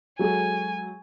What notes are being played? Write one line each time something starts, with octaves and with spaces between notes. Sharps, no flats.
F#3 G#3 A4 G#5